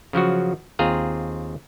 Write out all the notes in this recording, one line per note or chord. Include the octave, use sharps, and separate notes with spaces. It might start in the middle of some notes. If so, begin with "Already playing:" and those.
C#3 F3 F#3 F#4
D#2 C4 F4 G#4 F5 A#5